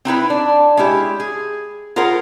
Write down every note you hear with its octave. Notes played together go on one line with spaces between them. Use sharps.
C4 D#4 E4 B4
D4
G#3 C#4 E4 G4
G#4
F4 G#4 A#4 C5 F#5